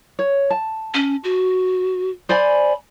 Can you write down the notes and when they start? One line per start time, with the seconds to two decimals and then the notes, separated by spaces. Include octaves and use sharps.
0.19 C#5
0.50 A5
0.94 C#4
1.24 F#4
2.29 C5 D5 G#5 B5